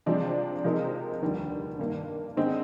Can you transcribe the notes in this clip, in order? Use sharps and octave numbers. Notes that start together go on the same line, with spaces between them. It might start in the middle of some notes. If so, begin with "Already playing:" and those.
C3 F3 G#3 D4
C3 F3 G#3 D#4 A#4
F1 D#2 D3 G3
G2 D#3 A#3
D3 G#3 C4 D#4